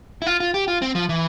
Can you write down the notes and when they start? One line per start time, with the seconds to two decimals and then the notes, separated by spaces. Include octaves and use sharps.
0.22 E4
0.27 F4
0.40 F4
0.54 G4
0.68 F4
0.82 C4
0.95 F3
1.09 E3